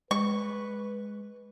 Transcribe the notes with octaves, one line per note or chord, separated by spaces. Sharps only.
G#3 B4 C#6